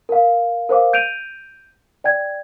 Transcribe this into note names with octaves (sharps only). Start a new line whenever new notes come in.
A#4 F5
A#4 C5 F5 D6
G6 D7 D#7 F7
D5 G5 G#6